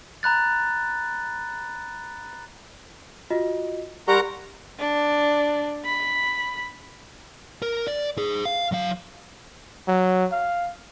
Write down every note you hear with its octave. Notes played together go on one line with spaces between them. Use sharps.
A#5 B5 F#6 A6
F4 F#4 D#5
G3 A#4 F#5 A#5 C6 C#6
D4
B5
A#4
D5
G#4 C5
F5
F#3 F5
F#3
F5